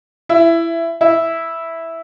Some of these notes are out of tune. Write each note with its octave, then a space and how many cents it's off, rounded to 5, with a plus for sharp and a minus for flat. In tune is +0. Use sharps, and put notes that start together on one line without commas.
E4 +15
E4 -5